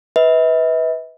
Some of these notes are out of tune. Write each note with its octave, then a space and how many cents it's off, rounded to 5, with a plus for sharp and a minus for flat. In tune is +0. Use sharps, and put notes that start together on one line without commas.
B4 +0 E5 -45